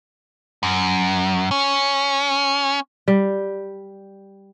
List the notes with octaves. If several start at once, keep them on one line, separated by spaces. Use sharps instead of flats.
F#2
C#4
G3